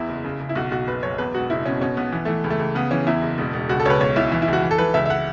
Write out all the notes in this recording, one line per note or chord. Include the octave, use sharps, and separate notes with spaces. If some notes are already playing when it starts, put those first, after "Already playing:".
Already playing: E2 E4
F#1
C#3
C#3
E4
B1 F#4
B1 F#4
F#1 B4
F#2 C#5
E2 B4
E1 F#4
F#1 E4
B2 C#4
B2 C#4
B1 B3
E3 B3
E3 A3
C#2
A3
C#2
C#3 B3
E3 C#4
E2 E4
F#1
E1
E1
C#2 F#4
A4
C#2 B4 C#5
B1 C#5
B1 E4
E3 E4
E4
C#2
F#4
E3
A4
E3 B4
C#2 E5
E5
F#5